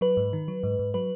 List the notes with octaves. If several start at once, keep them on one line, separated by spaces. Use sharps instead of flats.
F#3 B4
G#2
D#3
F#3
G#2
G#2
F#3 B4